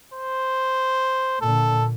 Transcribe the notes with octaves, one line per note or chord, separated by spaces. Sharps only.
C5
A#2 D3 A4